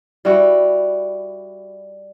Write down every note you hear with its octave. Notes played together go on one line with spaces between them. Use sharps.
G3 E4 F#4